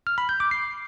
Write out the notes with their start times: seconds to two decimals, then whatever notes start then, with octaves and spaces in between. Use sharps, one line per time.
0.07 F6
0.18 B5
0.29 G6
0.40 D6
0.51 C7